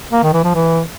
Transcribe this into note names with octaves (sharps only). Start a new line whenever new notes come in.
A#3
D#3
E3
F3
E3